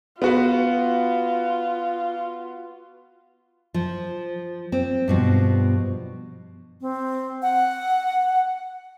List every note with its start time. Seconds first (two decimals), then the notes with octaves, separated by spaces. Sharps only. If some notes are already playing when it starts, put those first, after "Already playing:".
0.22 B3 F4 F#4 B4
3.74 F3
4.72 C4
5.08 G2 B2 F3
6.81 C4
7.42 F#5